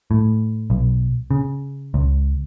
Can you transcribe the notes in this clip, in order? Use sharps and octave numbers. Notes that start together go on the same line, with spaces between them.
A2
B1
C#3
C#2